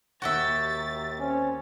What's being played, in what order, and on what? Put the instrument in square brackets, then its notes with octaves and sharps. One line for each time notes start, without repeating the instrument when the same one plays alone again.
[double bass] D#2 [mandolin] F#4 G4 E5 [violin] A6
[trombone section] C4 C#4